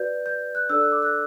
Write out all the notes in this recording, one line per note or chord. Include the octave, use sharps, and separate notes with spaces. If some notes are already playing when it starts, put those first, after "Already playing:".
Already playing: F#4 B4 D5 G6
G6
F#6
D4 A4 D5 E6
F#6
D6
F#6